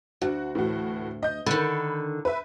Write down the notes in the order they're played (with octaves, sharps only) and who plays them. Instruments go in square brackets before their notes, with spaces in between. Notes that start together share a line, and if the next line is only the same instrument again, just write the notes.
[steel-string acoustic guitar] D2 [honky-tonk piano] D4 F#4
[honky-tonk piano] A2 E3 F#4
D#5 G6
[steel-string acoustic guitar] D3 D#3 [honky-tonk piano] B5
[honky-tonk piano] B4 E5